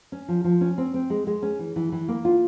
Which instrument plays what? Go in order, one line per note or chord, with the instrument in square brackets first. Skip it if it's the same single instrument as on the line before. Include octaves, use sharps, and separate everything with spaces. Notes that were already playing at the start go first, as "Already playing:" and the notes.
[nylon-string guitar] C#4
F3
F3
C#4
C4
C4
G#3
G#3
C#4
E3
E3
E3
A#3
F4